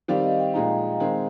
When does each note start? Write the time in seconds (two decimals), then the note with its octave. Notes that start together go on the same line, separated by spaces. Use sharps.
0.08 D#3 G3 C4 G4 D5 F5
0.24 D#5
0.39 G5
0.54 A#2 F3 G#3 D#4 A#5
1.00 D#3 G#3 C4